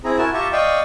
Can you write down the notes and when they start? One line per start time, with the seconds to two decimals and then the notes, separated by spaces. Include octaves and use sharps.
0.04 C4 E4 G#4 A#5
0.18 E4 F#4 A#4 G#5 A5
0.34 F4 G4 E5 A5 A#5 C#6
0.53 D5 D#5 F5 G5 C#6